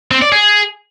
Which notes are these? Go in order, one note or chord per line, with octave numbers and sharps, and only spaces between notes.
C4
D5
G#4